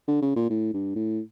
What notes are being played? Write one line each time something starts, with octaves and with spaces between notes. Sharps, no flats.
D3
C#3
A#2
A2
G2
A2